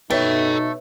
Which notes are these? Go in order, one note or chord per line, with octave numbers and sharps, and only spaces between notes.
B2 A3 D#4 A4 B4 C#5 E5 G5